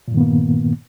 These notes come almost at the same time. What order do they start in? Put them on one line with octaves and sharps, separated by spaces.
A#2 G2 D#3 B3 A#3